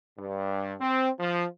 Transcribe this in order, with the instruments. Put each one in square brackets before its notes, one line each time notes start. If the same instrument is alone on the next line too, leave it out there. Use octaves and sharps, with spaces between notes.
[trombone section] G2
C4
F3